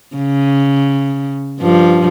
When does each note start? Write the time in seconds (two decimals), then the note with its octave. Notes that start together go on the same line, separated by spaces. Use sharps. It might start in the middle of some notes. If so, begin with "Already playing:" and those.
0.16 C#3
1.60 G2 F3